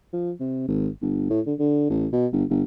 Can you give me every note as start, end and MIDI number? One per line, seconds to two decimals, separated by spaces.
0.13 0.31 53
0.40 0.66 48
0.68 0.89 32
1.01 1.26 31
1.30 1.41 45
1.46 1.54 50
1.59 1.90 50
1.90 2.07 33
2.13 2.27 47
2.32 2.44 31
2.50 2.63 31